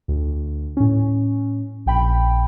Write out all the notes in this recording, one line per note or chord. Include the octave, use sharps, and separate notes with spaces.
D2
A2 C#4
A#1 G5 B5